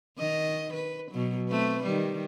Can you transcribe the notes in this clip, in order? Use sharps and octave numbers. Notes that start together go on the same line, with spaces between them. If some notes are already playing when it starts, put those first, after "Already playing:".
D#3 D#5
B4
B2 F#3
A3 C4 B4
D#3 G3